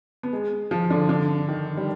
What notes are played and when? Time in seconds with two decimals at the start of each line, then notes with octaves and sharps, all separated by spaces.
0.23 B3
0.33 G#3
0.71 F3
0.90 D3
1.09 D3
1.49 D#3
1.77 G3